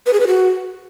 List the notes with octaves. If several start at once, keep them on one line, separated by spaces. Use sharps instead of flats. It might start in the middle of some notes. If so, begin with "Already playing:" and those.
B4
G#4
B4
F#4